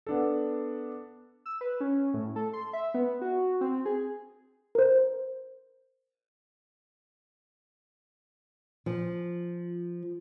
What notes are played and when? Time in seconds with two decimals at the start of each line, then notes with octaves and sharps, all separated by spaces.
0.07 B3 D4 A4
1.46 E6
1.61 B4
1.80 C#4
2.14 A2
2.36 A4
2.53 C6
2.73 E5
2.94 B3
3.21 F#4
3.61 C4
3.85 G#4
4.75 A#4 C5
8.86 F3